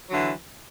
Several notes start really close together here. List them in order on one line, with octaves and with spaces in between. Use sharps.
F#3 D3 E3